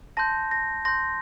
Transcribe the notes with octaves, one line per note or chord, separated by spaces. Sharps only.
A5 C6 G6 A#6
A#6
C6 G6 A#6